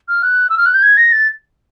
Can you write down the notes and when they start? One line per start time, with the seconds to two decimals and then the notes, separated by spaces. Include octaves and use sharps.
0.09 F6
0.23 F#6
0.50 E6
0.58 F6
0.66 F#6
0.74 G6
0.83 G#6
0.97 A#6
1.12 A6